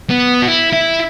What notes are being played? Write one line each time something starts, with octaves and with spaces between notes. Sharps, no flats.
B3
F#4
E4
E4